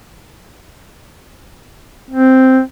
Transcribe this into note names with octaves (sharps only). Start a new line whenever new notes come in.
C4